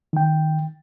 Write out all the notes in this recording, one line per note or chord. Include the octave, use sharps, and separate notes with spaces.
D#3 G5